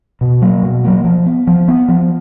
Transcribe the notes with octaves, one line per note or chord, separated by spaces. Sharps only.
B2
F#3 A#3
B2
F#3 A#3
F3
B3
F3
B3
F3